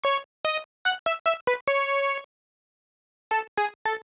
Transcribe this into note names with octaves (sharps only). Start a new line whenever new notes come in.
C#5 C#6
D#5 D#6
F#5 F#6
E5 E6
E5 E6
B4 B5
C#5 C#6
A4 A5
G#4 G#5
A4 A5